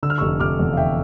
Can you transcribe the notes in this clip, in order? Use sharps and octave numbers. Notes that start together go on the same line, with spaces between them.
D3 E6
F6
F1 C#6 E6
F1 D6 F6
E2
F5
D3 E5 G5